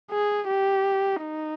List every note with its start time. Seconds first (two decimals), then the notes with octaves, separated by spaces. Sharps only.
0.11 G#4
0.48 G4
1.23 D#4